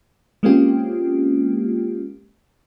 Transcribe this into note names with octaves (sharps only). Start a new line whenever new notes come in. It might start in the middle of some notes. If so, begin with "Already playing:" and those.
G#3 A#3 C4 C#4 F4 G4